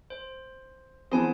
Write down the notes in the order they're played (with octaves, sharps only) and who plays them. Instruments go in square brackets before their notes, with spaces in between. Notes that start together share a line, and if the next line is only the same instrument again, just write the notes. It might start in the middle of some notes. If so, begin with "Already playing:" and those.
[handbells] C5
[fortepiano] E3 B3 C4 [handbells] G#4 G#5 A5 [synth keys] C5